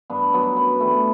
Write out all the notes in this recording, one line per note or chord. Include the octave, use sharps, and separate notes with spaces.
G2 B3 D4
F#3 B3
F#2 B3
E3 G3 A3
B3